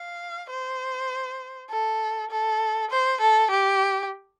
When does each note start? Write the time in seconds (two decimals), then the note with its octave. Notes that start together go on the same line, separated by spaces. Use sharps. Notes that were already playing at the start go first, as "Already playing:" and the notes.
Already playing: F5
0.50 C5
1.70 A4
2.31 A4
2.91 C5
3.21 A4
3.51 G4